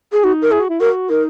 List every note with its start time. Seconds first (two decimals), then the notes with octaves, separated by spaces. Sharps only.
0.12 G#4
0.23 D#4 F#4
0.42 A#4
0.51 E4 G#4
0.60 F#4
0.69 E4
0.80 F#4 A#4
1.09 D#4 A#4